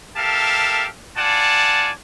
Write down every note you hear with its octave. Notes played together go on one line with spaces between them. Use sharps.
G4 A4 A#4 E5 F5 A5
F4 D5 F#5 G#5 A5